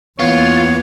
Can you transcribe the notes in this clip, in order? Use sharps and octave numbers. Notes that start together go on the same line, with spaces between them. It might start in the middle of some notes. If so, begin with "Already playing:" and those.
E2 E3 A#3 B3 F4 C#5